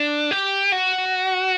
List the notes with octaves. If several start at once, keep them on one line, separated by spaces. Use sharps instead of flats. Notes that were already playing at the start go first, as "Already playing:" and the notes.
Already playing: D4
G4
F#4